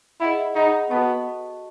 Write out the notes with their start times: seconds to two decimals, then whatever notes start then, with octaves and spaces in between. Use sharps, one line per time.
0.20 E4 G#4 D#5 F#5 B5
0.55 D#4 G#4 D#5 F#5 B5
0.90 B3 F#4 A4 D#5 A5 C#6